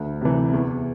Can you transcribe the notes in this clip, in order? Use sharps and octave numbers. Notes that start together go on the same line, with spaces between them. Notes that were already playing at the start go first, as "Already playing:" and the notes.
Already playing: D2
C3 E3
E2